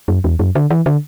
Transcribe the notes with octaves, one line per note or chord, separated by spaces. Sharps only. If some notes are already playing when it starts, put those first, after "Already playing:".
F#2
E2
F#2
D3
E3
D3